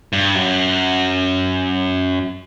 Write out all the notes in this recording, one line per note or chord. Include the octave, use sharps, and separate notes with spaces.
G2
F#2